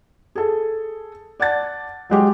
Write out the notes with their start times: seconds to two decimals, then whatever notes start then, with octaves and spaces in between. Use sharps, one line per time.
0.35 G#4 A4
1.40 D5 F#5 A5 A6
2.10 F#3 G#3 G4